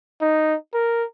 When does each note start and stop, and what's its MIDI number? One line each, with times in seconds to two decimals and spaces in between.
0.21 0.55 63
0.74 1.04 70